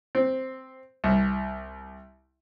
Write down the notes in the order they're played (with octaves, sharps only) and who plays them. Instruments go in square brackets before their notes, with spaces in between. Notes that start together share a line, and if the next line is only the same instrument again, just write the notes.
[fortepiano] C4
C2